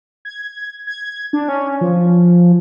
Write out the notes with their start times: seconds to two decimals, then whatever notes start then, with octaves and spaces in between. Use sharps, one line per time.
0.25 G#6
0.87 G#6
1.33 D4
1.49 C#4
1.81 F3